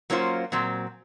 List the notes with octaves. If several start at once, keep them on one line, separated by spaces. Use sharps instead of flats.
F#3 A#3 C#4 F4 C5
A#2 F#3 C4